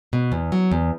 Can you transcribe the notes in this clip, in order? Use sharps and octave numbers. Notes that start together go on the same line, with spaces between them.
B2
E2
F#3
E2